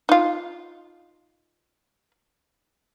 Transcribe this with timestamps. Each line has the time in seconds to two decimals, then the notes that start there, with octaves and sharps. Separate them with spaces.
0.09 D#4 F4